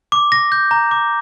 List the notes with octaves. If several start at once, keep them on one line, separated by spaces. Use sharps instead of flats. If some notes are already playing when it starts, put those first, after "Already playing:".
D6
A#6
G6
A#5
D6